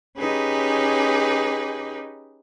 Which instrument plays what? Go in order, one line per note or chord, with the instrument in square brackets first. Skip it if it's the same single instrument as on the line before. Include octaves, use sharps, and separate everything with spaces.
[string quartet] C#4 D#4 G4 G#4 B4